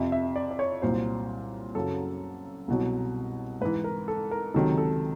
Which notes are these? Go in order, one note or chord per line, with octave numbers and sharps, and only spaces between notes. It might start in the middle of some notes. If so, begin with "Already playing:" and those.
Already playing: F2 C3 F3 E5
E5
D5
D5
C#5
C2 A#2 F#3 C5
F#2 C#3 F#3 A4
C2 B2 F#3
G#2 E3 B4
A#4
A4
A#4
C#2 C3 D#3 F#3 A4
A4